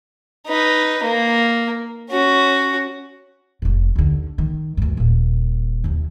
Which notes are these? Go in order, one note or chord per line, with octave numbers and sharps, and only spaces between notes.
D#4 B4
A#3
C#4 F#4
F1 C3
D#2 D3
D#3
D2 G2
D#1 A#2
D#2 C3